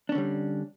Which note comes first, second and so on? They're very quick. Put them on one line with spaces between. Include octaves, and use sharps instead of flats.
D4 C#4 D3 G3